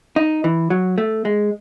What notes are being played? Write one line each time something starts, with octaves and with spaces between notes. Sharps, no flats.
D#4
E3
F#3
A3
G#3